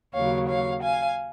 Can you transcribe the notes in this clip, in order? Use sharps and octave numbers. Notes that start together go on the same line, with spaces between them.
D#2 C#3 F#3 C#5 F5
C#5 F5
F5 G#5